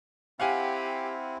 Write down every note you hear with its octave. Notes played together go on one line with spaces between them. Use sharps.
C4 E4 G4 F5 F#5 G#5